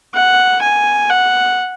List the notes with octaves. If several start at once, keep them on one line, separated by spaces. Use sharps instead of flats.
F#5
G#5
F#5